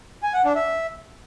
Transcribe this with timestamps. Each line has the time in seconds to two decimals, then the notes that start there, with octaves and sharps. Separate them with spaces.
0.23 G#5
0.34 F#5
0.45 D4
0.55 E5